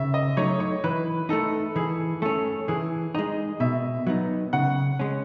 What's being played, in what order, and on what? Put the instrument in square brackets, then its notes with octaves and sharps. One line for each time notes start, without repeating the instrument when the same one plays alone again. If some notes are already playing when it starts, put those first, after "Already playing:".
Already playing: [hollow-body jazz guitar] C#3 [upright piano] E5
[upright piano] D#5
[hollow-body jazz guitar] F#3 A3 D#4 [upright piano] C#5
[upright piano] C#5
[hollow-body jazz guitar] E3 [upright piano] B4
[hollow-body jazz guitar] A3 D#4 [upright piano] A4
[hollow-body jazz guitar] E3 [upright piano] G#4
[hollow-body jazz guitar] A3 C#4 [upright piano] A4
[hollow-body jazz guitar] E3 [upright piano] G#4
[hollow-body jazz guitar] G#3 D#4 [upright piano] D#5
[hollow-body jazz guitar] B2 [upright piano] E5
[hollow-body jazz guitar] F#3 B3 D#4
[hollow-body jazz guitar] C#3 [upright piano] F#5
[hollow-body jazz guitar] G#3 C#4